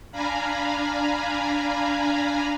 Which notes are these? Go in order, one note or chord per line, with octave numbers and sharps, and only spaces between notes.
D4 F5 G#5 A#5 B5